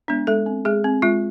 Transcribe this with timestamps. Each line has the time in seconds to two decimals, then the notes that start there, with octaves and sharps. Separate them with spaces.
0.08 G#3 B3 D4
0.27 G#3 A4
0.46 C4
0.65 G#3 G#4
0.84 C4
1.02 G#3 F4